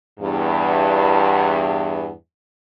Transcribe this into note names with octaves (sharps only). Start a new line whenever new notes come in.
E2 G2